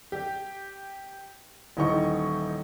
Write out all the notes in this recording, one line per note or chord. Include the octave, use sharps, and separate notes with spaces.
G4
D#1 E3 D#4 G4 C#6